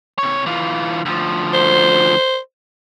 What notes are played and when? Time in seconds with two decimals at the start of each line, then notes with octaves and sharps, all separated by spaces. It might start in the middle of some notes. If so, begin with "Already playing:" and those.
0.18 C3 C#5
0.46 E3 F4
1.06 D2 F3
1.54 C5